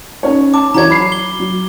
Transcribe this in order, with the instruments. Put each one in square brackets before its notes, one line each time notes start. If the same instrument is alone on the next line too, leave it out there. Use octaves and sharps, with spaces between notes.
[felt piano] C#4 D#4 C#5
[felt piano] A5 [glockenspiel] D6
[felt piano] E3 F#4 C#5 [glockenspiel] A#5 G#6
[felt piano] F#3 B5 C7
[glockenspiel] G7
[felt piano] F#3